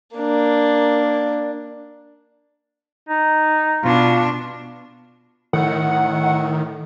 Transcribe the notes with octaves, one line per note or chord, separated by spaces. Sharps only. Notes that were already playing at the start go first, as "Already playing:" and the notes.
A#3 D4
D#4
B2 D4 F4
A2 D#3 F#5